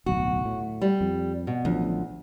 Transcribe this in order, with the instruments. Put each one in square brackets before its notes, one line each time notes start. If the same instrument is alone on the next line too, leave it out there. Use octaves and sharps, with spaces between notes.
[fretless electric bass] D1 B1 [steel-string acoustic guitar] F#4
[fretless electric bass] A2
[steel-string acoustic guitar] G3
[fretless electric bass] F2
[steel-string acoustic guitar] B2
[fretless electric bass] A1 F3 F#3 [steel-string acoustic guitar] D2